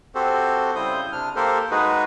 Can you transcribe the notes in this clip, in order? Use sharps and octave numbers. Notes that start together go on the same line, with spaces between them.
C4 F#4 G4 A4 C5
C#3 G3 E4 C5 D#6 G6
C3 D4 F6
A#3 G4 A4 A#4 C5
G#3 D#4 F#4 G#4 B4